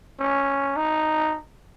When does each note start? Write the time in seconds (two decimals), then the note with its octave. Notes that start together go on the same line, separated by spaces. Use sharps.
0.19 C#4
0.76 D#4